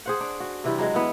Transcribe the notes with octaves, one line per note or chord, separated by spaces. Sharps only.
G#4 C5 F#5
D4
F#4
C3 E3 G3
F#3 G#3
E3 B3